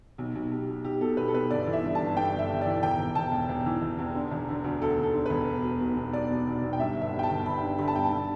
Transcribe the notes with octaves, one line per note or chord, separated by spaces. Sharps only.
B1
B1
B1 G4
B2
B1 G4
B2 A4
B1 B4
A4
B2 B4
G1 D5
E3
E5
G2
A5
G1
G2 G5
G1
E5
G1
E3 D5
E1 G5
E1
E1 A5
E1
E1
E3
E1
E2
D3
E1
D3
D2
D2 A4
D2
A4
D3
E1 B4
B2
B2
B1
B1
B1 D5
B2
B1
B1
G5
G2 E5
G1
E5
G2
G5
A5
G1
G1 B5
D3
D3 B5
A5
G2 G5
A5
D3